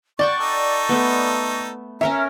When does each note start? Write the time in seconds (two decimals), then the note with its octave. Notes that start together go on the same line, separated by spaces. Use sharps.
0.19 D5 F#5 G5 A5 C#6
0.41 D#4 A4
0.89 A3 B3
2.01 C#4 A#4 C#5 E5 A#5